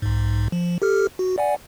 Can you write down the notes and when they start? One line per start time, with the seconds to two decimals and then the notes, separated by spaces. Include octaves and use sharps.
0.02 B1 G#2
0.52 F3
0.82 G4 A4 F6
1.19 F#4
1.38 D5 F#5 G#5